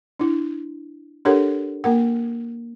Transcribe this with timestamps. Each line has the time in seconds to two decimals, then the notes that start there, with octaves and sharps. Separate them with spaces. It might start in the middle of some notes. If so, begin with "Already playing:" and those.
0.20 D4 E4
1.25 D4 G4 A4 A#4 C#5 F#5
1.84 A#3 A#4 F#5